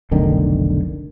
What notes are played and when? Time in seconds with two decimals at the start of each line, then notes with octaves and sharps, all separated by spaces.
0.11 F1 B1 D3 D#3